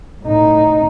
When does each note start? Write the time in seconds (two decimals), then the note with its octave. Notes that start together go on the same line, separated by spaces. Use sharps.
0.23 A2 D#4